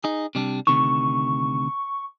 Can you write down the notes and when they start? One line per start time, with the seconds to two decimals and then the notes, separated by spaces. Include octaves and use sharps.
0.04 D#4 G#4
0.35 C3 G3 D4
0.67 D2 C3 D#3 C#6